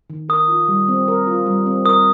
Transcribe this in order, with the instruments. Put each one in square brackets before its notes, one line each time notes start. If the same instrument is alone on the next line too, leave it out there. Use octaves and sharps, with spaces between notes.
[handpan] D#3
[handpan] A#4 [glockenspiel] D#6
[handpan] F4
G3
C4
A#4
F4
G3
C4
[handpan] A#4 [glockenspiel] D#6